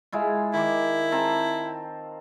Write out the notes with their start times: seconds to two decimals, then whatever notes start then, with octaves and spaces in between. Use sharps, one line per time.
0.12 G#3 E4 F4
0.54 D#3 E4 D6
1.12 C4 A5 A#5